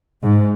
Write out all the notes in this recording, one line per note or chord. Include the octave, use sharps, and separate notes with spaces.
G#2